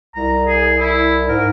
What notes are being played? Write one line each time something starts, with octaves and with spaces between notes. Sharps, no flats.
C2 A#5
G#4
E4
G#2 A#4